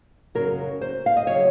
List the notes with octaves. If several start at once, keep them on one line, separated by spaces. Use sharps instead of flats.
F#2 C#3 F#3 A#4
C5
F5
D#5
C#3 F#3 C#5